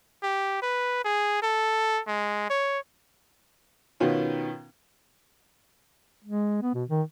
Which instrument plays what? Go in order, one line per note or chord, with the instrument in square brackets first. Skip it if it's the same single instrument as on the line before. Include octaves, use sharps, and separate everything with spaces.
[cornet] G4
B4
G#4
A4
G#3
C#5
[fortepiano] B2 D#3 B3 C#4 F4
[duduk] G#3
B3
B2
D#3